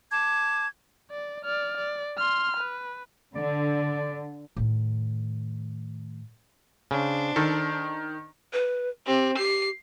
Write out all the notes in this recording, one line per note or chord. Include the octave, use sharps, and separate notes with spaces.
A5 D6 G#6
D5
D5 F6
D5
C6 F6
B4
D3 D5
A2 D#3
C#3 D4 C5
D#3 A4
B4
C4 G4
G4 C7